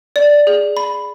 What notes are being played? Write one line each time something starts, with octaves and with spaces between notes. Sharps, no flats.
D5
G#4
B5